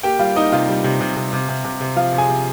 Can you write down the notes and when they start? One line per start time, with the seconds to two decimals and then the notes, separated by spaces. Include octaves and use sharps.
0.03 A#3 G4 G5
0.19 G3 F4 F5
0.35 A#3 D#4 D#5
0.52 C3 F4 F5
0.68 G3
0.84 C3
1.01 C3
1.17 C3
1.33 C3
1.49 C3
1.64 C3
1.81 C3
1.96 F3 F4 F5
2.13 C3
2.18 G#4 G#5
2.29 C3